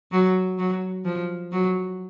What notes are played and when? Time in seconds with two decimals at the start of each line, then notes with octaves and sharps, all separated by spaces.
0.12 F#3
0.58 F#3
1.05 F3
1.52 F#3